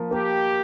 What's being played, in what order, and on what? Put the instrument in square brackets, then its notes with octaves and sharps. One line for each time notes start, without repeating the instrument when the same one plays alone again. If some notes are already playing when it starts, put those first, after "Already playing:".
Already playing: [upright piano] F3 A#3
[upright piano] A#3 [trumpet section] G4